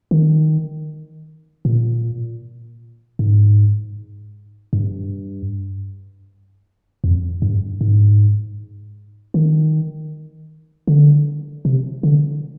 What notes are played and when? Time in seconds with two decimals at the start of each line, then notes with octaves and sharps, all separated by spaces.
0.11 D#3
1.65 A#2
3.19 G#2
4.73 G2
7.04 F2
7.42 G2
7.81 G#2
9.34 D#3
10.88 D3
11.65 C3
12.03 D3